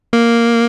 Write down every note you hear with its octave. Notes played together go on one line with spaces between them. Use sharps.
A#3